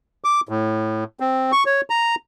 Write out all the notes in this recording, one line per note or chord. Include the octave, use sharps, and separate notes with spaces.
D6
A2
C4
C#6
C#5
A#5